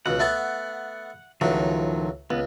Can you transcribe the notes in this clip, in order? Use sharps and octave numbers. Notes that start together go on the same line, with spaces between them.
C#2 B2 F#5
A3 B3 A5
C#2 A2 D#3 F3 F#3
C#2 B3